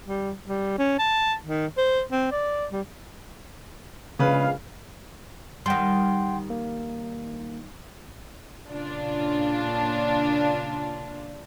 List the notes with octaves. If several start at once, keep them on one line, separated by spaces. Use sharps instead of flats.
G3
G3
C#4
A5
D#3
C5
C4
D5
G3
A#1 C#3 G#3 B4 F5
D#3 G3 F#5 G5 C6
A#3
A#2 C#3 D4 F4